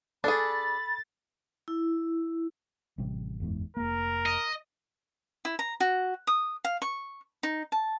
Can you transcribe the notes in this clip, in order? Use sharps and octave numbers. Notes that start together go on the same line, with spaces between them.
D4 G#4 A4 B5 A6
E4
A1 C3 G3
F#1 E2 G#2
F1 A#3 A#4
D#5
E4
A#5
F#4
D#6
F5
C#6
D#4
A5